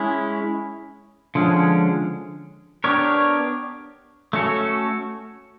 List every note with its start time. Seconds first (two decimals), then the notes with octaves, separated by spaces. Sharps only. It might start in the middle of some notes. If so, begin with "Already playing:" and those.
Already playing: G#3 C#4 E4
1.35 D3 F3 G#3 C#4
2.84 B3 D4 G4 A#4 C#5
4.33 A3 C#4 F#4 A4 C#5